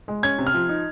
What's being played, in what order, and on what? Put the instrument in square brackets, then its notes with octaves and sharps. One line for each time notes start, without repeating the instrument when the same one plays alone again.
[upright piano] G#3
[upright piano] C#4 [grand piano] G#6
[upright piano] C3
[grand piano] F6
[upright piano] F3
D#4